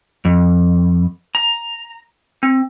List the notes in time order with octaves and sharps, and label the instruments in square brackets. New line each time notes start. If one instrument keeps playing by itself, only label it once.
[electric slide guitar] F2
A#5
C4